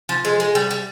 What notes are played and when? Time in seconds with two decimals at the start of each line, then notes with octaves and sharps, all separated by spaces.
0.09 F3
0.25 G#3
0.40 G#3
0.55 G3
0.71 G3